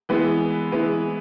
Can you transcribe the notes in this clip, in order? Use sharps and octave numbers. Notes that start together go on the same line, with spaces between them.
E3 G#3 B3 E4 B4
E3 G#3 B3 E4 B4